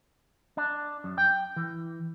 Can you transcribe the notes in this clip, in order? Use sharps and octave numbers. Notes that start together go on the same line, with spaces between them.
D4
F#2
G5
E3